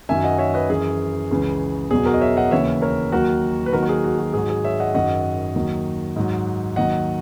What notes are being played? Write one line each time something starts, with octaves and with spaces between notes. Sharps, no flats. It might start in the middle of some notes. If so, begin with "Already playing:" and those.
F#2 D#3 F#3 E5 G#5
D#5 F#5
C#5 E5
B4 D#5
F#2 E3 G#4
C#2 C#3 E3
E2 B2 F#3 G#4
F#4 A#4
D#5
C#5 E5
D#5 F#5
D#2 C#3 E3 C#5 E5
A#4 C#5
D#2 D#3 F#3 F#4 A#4
B4
D#2 D#3 F#3 F#4 A#4
F#4
G#4
F#4
F#4
G#2 F#3 G#4
G#4
C#5 E5
D#5 F#5
F#2 D#3 F#3 D#5 F#5
D#2 D#3 F#3
G#2 F#3
D#2 D#3 F#3 D#5 F#5